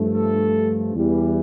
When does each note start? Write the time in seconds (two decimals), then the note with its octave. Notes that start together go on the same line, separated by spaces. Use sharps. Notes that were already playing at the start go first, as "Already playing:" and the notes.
Already playing: G2 F3 A3
0.15 A4
0.95 E2 E3 G3